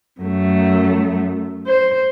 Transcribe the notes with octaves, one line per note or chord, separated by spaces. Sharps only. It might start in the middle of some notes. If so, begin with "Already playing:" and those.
F#2 A3
C5